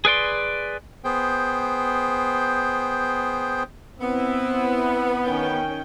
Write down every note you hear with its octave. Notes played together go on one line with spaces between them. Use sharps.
G#4 B4 D5 C6
B3 G#4 C5 G5
B3 C4 E4 E5
D#3 C#4 G5